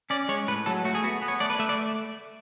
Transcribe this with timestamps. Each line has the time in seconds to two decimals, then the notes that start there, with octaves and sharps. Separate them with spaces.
0.10 C#4 D5
0.29 G#3 C#5
0.47 A2 B4
0.66 F#3 A4
0.85 A3 F#4
0.95 G#4
1.04 B3 F#4
1.22 B3
1.28 C#5
1.40 A3 D5
1.50 B4
1.59 A3 E5
1.69 D5